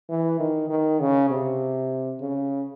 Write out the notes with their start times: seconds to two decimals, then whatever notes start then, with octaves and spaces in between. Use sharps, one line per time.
0.09 E3
0.39 D#3
0.70 D#3
1.00 C#3
1.30 C3
2.21 C#3